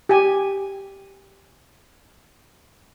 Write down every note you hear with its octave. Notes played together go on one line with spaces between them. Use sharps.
G4 G#5